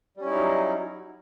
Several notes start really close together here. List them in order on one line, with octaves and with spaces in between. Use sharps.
G3 C#4 E4 D#4 F#3